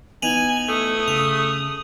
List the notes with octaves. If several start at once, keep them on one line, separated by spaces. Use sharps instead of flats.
E3 B3 D#4 G#5 D#7 F7 F#7
A3 D#6
C#3 F7